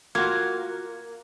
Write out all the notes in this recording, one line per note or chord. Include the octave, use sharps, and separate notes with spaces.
A#3 F4 F#4 G#6